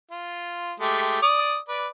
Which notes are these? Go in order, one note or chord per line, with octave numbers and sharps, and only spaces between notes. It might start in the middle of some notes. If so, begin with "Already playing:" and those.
F4
G#3 A3 G4
D5 D#6
B4 D5